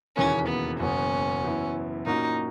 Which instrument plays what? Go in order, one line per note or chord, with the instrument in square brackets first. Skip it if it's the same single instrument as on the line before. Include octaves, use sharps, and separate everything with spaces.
[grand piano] E1 D#2 C#3 E3 A#3 [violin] C#4
[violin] B3
[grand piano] F#1 E2 B2 A#3 [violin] C#4
[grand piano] F#1 F#2 E3 B3 E4
[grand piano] A#2 A#3 C#4 F#4 [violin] D#4